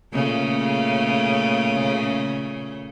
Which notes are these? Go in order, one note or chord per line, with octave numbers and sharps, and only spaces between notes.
A#2 C#3 A3